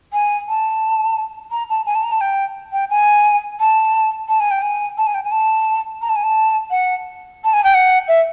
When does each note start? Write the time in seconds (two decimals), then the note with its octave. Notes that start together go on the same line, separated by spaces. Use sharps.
0.13 G#5
0.49 A5
1.51 A#5
1.70 A5
1.86 G#5
1.95 A5
2.04 A#5
2.12 A5
2.21 G5
2.73 G5
2.90 G#5
3.60 A5
4.28 A5
4.40 G#5
4.51 G5
4.62 G#5
4.98 A5
5.07 G#5
5.14 G5
5.24 G#5
5.32 A5
6.02 A#5
6.09 A5
6.16 G#5
6.24 A5
6.71 F#5
7.44 A5
7.53 G#5
7.64 G5
7.74 F#5
8.08 E5